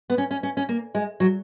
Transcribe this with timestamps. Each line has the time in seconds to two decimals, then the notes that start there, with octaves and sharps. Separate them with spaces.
0.10 B3
0.18 C#4
0.31 C#4
0.43 C#4
0.57 C#4
0.69 A#3
0.95 G#3
1.20 F#3